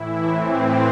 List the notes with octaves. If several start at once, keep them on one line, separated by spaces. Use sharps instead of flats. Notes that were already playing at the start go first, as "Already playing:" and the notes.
Already playing: A2 E3 E4
A2 E3 C4